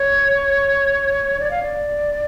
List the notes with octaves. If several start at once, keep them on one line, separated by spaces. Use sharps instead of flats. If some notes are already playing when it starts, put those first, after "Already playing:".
Already playing: C#5
D5
F5
D5